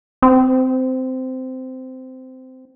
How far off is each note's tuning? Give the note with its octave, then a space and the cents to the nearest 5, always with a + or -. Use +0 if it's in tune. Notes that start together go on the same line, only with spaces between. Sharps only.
C4 -15